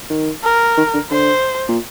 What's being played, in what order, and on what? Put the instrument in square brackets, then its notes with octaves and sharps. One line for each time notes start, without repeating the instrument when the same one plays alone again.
[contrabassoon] D#3
[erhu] A#4
[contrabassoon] D#3
D3
[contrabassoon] D3 [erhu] C5
[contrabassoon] A#2